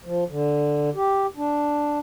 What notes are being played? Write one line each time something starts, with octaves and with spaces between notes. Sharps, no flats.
F3
D3
G4
D4